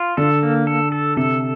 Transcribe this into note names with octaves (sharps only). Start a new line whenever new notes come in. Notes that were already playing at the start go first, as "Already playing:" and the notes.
Already playing: F4
D3 A4
A#3
A4
A4
C3 A4